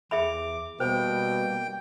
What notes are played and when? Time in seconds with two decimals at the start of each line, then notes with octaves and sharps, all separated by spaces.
0.11 E2 G#4 E5 B5 D6
0.80 B2 G3 A#3 C5 G5